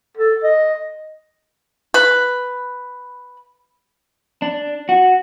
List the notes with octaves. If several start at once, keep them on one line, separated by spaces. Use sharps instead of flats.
A4
D#5
B4
D4
F#4